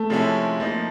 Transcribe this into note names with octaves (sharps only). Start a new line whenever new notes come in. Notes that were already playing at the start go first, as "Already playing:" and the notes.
Already playing: A3
C3 F3 G#3 C#4 E4
F3 A#3 D#4